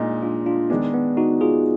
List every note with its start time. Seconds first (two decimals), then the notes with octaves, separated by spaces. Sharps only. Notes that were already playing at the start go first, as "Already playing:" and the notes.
Already playing: A#2 G#3 A#3 D4 D#4
0.22 D4 F4
0.46 D4 F4
0.70 D#3 G#3 B3 D4
0.94 B3
1.17 D#4 F#4
1.41 F4 G#4